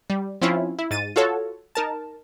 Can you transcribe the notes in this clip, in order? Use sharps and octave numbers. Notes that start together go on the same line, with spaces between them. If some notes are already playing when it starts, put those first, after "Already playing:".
G3
F3 C4 C#4 E4 F4
E4
G#2 A6 D#7
F4 F#4 A4 C#5
D#4 A#4 A5